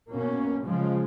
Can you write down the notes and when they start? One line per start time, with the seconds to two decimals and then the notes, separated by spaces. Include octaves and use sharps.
0.10 B2 A#3 C#4
0.64 C#3 F3 G#3